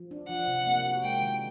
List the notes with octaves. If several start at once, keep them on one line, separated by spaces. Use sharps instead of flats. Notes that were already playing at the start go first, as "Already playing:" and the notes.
Already playing: F3
D4
F3 F#5
C3
A#3
F#4
G#3 G5
D#3